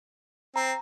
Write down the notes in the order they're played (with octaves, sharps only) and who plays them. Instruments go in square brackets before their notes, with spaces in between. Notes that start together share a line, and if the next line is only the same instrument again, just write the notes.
[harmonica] C4 [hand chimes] A#5